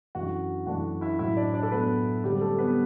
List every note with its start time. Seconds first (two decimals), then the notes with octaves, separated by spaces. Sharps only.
0.15 F#2 E3 A3 D4 F#4
0.67 F#2 E3 A3 D4 F#4
1.01 E4 E5
1.19 A2 F#3 A3 E4 E5
1.37 D4 D5
1.54 D4 D5
1.63 A4
1.72 A2 F#3 A3 B3 B4
2.24 D3 F#3 G3 C4 G4
2.41 A3 A4
2.58 B3 B4